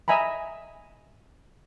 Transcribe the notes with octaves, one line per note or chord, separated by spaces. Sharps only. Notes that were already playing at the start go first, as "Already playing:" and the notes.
D#5 E5 G#5 A#5 B5